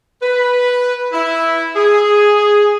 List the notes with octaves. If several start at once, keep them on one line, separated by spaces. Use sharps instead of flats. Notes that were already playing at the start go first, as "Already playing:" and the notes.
B4
E4
G#4